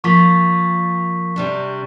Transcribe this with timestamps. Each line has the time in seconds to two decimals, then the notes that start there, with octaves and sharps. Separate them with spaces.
0.04 F3 A#3 F4 C#6 B6
1.36 C3 G3 D4